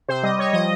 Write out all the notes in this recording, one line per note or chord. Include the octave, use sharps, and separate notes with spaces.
C3 C5
G3 D#5
G3 C#5
F3 D#5